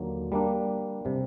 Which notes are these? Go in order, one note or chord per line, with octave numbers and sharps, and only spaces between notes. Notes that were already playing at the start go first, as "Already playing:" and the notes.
Already playing: D#2 D3 F#3 A#3
G3 A#3 D4
C3 G3